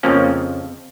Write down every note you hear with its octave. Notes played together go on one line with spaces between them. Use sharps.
F2 C#3 F3 A#3 C#4